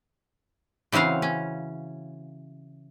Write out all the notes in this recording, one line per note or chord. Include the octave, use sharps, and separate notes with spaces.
C#3 E3 C4 F#4 F5
C#4